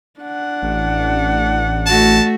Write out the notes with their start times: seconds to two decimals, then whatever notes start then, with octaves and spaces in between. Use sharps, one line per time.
0.20 D4 F#5
0.62 A1
1.87 A3 F#4 A5